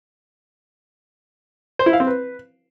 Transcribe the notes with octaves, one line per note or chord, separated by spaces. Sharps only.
C5
E4
F5
C4
B4